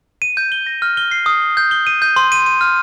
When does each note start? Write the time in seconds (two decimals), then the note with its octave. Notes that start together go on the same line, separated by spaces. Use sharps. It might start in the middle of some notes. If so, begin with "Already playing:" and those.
0.22 D#7
0.37 G6
0.52 G7
0.67 A#6
0.82 F6
0.97 G7
1.11 C7
1.26 D#6
1.42 G7
1.57 G6
1.71 G7
1.87 D#7
2.02 G6
2.16 C6
2.32 D#7
2.46 D#7
2.61 F6